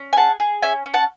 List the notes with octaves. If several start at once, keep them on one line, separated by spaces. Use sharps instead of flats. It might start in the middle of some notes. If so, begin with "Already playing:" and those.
Already playing: C#4
G#5
G#4 F#5 A5
G#4
C#4 E5 G#5
C#4
F#5 A5